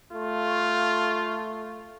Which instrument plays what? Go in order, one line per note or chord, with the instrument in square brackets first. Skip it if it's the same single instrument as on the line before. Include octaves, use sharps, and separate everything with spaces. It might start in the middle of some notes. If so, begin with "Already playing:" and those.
[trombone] A3 [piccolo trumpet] F4